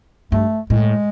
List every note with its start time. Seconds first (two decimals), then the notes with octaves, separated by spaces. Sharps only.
0.32 G2 A3
0.70 A2 G#3